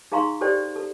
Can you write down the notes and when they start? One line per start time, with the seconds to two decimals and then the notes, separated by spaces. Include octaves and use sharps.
0.12 D#4 G#4 F5 A#5 C6 C#6
0.41 G4 A4 C5 D5 G5
0.76 A4